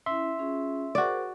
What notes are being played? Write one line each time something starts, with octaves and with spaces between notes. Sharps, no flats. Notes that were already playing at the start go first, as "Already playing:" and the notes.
C#4 E4 E5 C6
C#4 F4 G#4
F#4 G#4 A#4 C5 D5